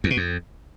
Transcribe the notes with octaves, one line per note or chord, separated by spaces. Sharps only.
E2
B2
F2